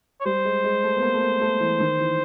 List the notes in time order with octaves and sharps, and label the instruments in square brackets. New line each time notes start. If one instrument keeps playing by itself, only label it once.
[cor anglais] C#5
[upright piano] G3 [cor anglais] C5
[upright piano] G#3
G#3
A3
B3
A#3
A3
A#3
A3
E3
D#3
E3